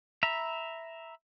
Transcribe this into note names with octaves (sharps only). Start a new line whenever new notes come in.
E5 A#5 B5